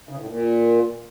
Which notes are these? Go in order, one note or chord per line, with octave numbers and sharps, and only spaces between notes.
C#3
A2
A#2